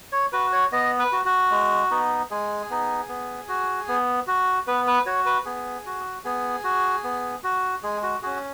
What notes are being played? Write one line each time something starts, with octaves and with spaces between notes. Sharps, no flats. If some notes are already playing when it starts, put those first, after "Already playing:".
C#5
F#4 B4
C#5
B3 D#5
B4
F#4
F#4
G#3
B3 D#4
G#3 G#4
B3 D#4
B3
F#4
B3
F#4
B3 B4
B4
F#4 C#5
B4
B3 G#4
F#4
B3 G#4
F#4
B3
F#4
G#3 G#4
F#4
C#4 F#4 G#4